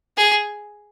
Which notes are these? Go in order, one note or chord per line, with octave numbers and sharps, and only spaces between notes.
G#4